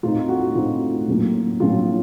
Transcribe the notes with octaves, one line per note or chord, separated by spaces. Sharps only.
A2 A3 C4 D#4 F4
F#4
A2 A3 C4 D#4 F4
A2 F#3 A#3 C#4
A2 F#3 A#3 C#4 F4